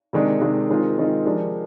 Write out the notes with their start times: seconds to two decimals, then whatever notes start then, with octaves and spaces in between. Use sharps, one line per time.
0.13 C3 D#3 G#3 D4
0.41 C3 D#3 G#3 D4
0.69 D#3 G#3 C4 F4
0.98 D#3 G#3 C4 F4
1.25 F3 G#3 D4 G4 A#4